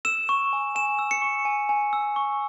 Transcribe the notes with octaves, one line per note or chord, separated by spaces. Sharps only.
E6 E7
C#6
G#5
G#5 E7
E6
C#7
C#6
G#5
G#5
E6
C#6